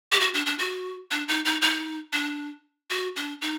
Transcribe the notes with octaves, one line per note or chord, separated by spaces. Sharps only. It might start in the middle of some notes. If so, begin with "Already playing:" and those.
G4
F#4
D4
D4
F#4
D4
D#4
D#4
D#4
D4
F#4
D4
D#4